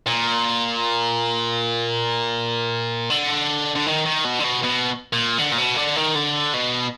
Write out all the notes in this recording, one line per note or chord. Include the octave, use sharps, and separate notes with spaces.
A#2
D3
D3
D#3
D#3
B2
D3
B2
B2
A#2
D3
A#2
B2
D3
D#3
D3
B2